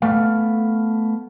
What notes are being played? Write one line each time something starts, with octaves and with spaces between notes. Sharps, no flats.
A3 B3 F5